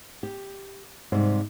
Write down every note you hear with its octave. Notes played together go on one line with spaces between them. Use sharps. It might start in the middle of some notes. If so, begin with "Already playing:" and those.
G4
G#2 C3 G3